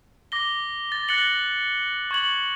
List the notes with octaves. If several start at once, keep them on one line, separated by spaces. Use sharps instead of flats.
D6 A#6 G7
A6
F#6 A6 A#6 C#7 F#7 G7
C#6 G#6 F#7